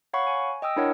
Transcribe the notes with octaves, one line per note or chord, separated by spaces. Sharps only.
C#5 F5 F#5 B5 C#6
G#5
D#5 G5 D#6 E6
D4 E4 A#4 C#5 F#5